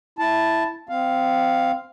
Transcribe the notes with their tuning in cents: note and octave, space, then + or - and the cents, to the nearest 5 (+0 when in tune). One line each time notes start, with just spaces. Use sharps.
E4 +0 A5 +0
C4 -15 F5 +0